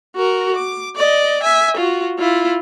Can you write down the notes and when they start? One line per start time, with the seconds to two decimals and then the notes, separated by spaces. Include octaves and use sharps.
0.16 F#4 A#4
0.56 D6
0.96 D5 D#5
1.43 E5 G#5
1.77 F4 F#4
2.19 E4 F4